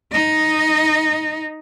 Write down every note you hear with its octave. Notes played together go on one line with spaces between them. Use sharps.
D#4 D#5